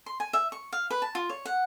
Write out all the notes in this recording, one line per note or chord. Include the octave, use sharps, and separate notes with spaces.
C6
G#5
E5
C#6
F5
B4
A5
F4
C#5
F#5